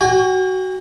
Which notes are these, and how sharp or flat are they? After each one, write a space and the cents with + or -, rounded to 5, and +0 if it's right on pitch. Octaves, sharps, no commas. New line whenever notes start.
F#4 +15 G5 +45